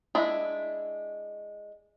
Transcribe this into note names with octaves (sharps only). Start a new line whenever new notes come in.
G#3 D4 E4